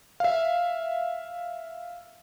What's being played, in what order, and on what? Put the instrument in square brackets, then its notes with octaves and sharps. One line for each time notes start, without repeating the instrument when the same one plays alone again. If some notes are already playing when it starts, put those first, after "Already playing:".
[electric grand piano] E5 F5